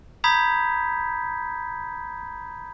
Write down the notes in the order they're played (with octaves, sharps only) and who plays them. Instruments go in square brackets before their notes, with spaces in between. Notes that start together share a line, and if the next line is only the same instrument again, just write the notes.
[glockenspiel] A#5 B5 D#6 G6 G#6 B6